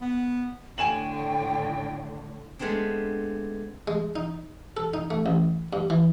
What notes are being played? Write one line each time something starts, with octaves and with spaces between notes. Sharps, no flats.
B3
A2 D3 G5 G#5 E7 F#7
G#3 A3 B3 C4 D4
G#3
D#4
A4
D#4
A3
A1
G2
E3